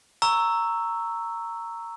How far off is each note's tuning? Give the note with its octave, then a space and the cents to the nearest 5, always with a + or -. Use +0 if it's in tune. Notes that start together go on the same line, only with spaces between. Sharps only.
A#5 -10 C#6 +0 E6 +0